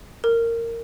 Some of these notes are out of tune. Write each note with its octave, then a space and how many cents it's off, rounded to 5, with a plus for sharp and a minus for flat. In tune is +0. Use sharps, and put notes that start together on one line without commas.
A#4 -15